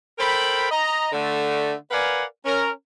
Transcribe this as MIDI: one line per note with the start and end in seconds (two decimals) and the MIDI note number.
0.19 0.66 69
0.19 0.66 70
0.19 0.66 72
0.19 0.66 79
0.19 0.66 83
0.71 1.09 75
0.71 1.09 82
1.12 1.74 50
1.12 1.74 57
1.91 2.24 70
1.91 2.24 71
1.91 2.24 74
1.91 2.24 77
1.91 2.24 78
1.91 2.24 80
2.45 2.69 61
2.45 2.69 70